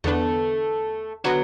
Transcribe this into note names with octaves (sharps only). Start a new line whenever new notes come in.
E2 D3 A3 B3 D4 B4
D3 F#3 B3 F#4 B4